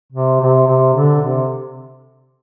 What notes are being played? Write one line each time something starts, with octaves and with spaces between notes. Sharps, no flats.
C3
C3
C3
D3
C3